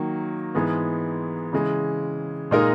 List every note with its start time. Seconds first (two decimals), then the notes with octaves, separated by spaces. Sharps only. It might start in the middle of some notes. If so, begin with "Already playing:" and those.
Already playing: D#3 F#3 A#3
0.55 G#2 E3 G#3 B3
1.53 C#3 E3 G#3
2.51 A#2 G#3 D#4 A#4